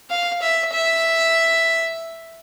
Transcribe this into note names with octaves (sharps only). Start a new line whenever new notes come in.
F5
E5
E5